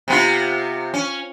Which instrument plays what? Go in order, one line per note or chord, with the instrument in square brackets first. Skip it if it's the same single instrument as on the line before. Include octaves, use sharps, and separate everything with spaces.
[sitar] C3 B3 F4
C#4